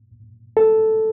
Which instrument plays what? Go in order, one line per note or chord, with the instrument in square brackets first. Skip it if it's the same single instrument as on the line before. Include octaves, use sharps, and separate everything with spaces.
[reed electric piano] A4